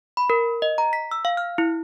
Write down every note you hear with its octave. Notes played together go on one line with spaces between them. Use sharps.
B5
A#4
D#5
A#5
B6
E6
F5
F6
E4